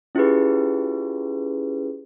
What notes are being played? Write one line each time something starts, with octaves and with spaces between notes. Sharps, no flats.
C#4 E4 F4 G4 G#4 B4